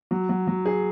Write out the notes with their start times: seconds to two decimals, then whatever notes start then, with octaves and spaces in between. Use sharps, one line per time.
0.11 F#3
0.29 F#3
0.47 F#3
0.66 G#4